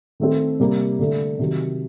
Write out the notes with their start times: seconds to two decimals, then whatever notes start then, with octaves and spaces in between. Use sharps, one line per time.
0.20 D#3 A3 C4
0.59 C3 G3 A#3
0.99 D3 A3 D4
1.39 C3 D#3 F#3